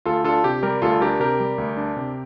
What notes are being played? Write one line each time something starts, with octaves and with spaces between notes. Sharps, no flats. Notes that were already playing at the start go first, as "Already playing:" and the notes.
D2 F4 A4
D4 F4 A4
C3 G4
G3 G4 A#4
D2 F4 A4
D4 G4 A#4
C3 G4 A#4
G3
D2
D4
C3